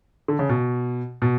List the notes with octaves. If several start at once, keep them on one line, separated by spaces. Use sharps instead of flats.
D3
C#3
B2
B2